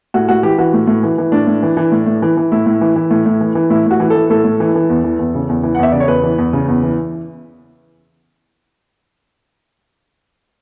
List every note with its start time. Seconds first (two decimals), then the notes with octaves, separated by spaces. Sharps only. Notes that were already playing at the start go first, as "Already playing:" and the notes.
0.14 A2 F#4
0.29 A2 F#4
0.43 E3 G4
0.58 E3 F#4
0.73 A2
0.87 A2
1.03 E3
1.18 E3
1.32 A2 D4
1.47 A2
1.63 E3
1.77 E3
1.92 A2
2.06 A2
2.22 E3
2.37 E3
2.52 A2 E4
2.66 A2
2.81 E3
2.96 E3
3.11 A2
3.26 A2
3.41 E3
3.55 E3
3.70 A2 E4
3.86 A2 F#4
4.00 E3
4.10 E3 A4
4.30 A2 A4
4.44 A2
4.60 E3
4.75 E3
4.89 E2
5.04 E3
5.19 E2
5.35 C#3
5.49 E2
5.63 E3
5.75 F#5
5.79 E2 E5
5.92 C#3 D5
6.00 C#5
6.08 E2 B4
6.24 E3
6.38 E2
6.53 C#3
6.68 E2
6.83 E3